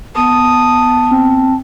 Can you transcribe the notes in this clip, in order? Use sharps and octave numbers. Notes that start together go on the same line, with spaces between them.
B3 A5 D#6
C4